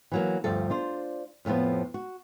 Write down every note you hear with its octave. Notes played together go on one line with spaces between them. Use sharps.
E3 F#3 A#3
D2 G2 F3 A4
D4 F4 C5
F2 A2 D#3 F3 B3
F#4